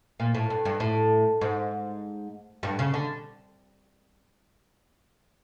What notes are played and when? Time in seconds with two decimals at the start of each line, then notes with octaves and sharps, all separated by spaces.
0.20 A#2
0.34 A2
0.50 G2
0.65 G2
0.80 A2
1.41 G#2
2.63 G2
2.79 C#3
2.94 D3